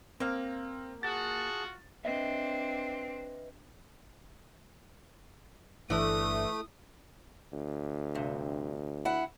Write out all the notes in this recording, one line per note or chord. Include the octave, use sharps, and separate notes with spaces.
A#3 C4 F5
F4 F#4 G#4 F#5 A5 A6
C4 D4 B4 D#5 E5
G1 E3 A3 C4 D4 D#6
D2
G2 C3
E4 F#5